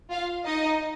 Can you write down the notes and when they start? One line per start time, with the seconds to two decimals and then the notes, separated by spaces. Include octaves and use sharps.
0.11 F4 F5
0.45 D#4 D#5